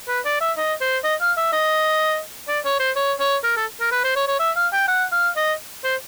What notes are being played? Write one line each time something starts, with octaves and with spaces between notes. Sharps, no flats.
B4
D5
E5
D#5
C5
D#5
F5
E5
D#5
D5
C#5
C5
C#5
C#5
A#4
A4
A#4
B4
C5
C#5
C#5
E5
F5
G5
F#5
F5
D#5
C5